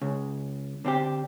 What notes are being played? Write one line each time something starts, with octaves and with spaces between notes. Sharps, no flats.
C#2 C#3
D3 C4 D4 G4